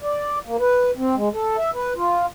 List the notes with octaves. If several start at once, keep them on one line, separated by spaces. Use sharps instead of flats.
D5
A#3
B4
C4
G#3
A4
E5
B4
F4